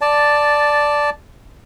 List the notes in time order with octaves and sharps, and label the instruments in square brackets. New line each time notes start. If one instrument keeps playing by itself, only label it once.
[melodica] D5 A5